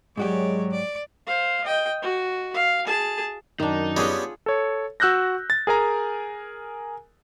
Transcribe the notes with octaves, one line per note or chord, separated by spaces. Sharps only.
G#2 F#3 G#3 F#4 G4 C#5 D5
D5
C5 F5
D#5 G5
F#4
F5
G#4 A5
F#2 D#3 D4 D#4
G3 B3 C#4 F4 G#4 F#5
A4 C#5
F#4 E6 F#6 G6 A#6
A6
G#4 A#4 G#5 A#5